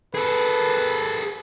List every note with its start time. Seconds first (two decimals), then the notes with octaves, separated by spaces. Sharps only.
0.14 G#4 A4 B4